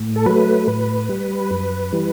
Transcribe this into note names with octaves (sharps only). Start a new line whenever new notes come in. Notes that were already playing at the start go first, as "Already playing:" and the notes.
Already playing: A2
A4
F#3 A3 B4
A2 B4
G3
F#2
E3 G3